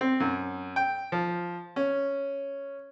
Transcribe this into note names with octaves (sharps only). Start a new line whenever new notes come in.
C4
F#2
G5
F3
C#4